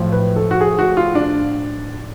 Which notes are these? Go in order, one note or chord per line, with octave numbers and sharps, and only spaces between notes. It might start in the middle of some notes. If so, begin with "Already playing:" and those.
Already playing: B1 A2 F3
B4
A4
F#4
G#4
F#4
F4
D4